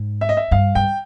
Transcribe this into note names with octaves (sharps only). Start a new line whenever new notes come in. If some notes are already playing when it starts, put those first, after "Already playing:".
Already playing: G#2
E5
D#5
E5
G2 F5
G2 G5